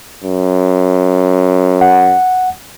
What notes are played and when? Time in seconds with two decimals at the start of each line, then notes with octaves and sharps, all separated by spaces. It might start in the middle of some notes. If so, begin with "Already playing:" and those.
0.24 F#2
1.81 F#5